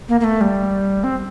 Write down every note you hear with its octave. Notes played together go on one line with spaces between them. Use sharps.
A#3
A#3
A3
G3
C4